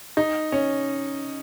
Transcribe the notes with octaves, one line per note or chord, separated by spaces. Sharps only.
D#4
C#4